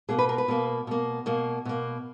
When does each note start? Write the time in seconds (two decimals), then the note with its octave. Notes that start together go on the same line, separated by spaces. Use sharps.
0.09 B2 A#3 G#4
0.19 B4
0.29 A#4
0.38 B4
0.48 B2 A#3
0.87 B2 A#3
1.26 B2 A#3
1.66 B2 A#3